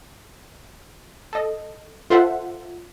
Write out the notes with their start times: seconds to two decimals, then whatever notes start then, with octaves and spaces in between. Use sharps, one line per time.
1.33 A4 D#5
2.10 F4 A4 C5 E5 F#5